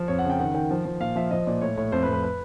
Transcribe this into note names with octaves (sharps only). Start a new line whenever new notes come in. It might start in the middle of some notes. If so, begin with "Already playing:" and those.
Already playing: F3
F2 C#5
F#5
C#3
G5
D#3 F#5
D#3 G5
F3
F3
A#2 F5
F3 E5
F3 D#5
A#2 D5
A2 C#5
A2 C#5
F2 C5
B4
F2
B4
B4